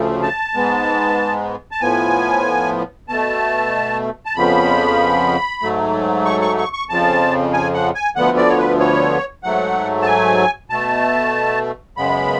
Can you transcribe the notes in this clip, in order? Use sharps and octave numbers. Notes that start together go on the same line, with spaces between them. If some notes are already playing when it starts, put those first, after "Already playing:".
Already playing: D2 C#3 F3 A3
A5
G#2 G#3 B3
A5
A2 F3 B3 G#5
B2 A3 A5
A5
F2 C#3 F3 B3 B5
G#2 F#3 A3
C#6
C#6
C#6
C#6
F2 C#3 F3 A5
G#5
F#5
G#5
D2 D3 F3 B3 F#5
D5
C#5
B4
C#5
G#2 F#3 A3 F#5
A5
G#5
B2 A3 A5
F#2 C#3 G#3 B3 B5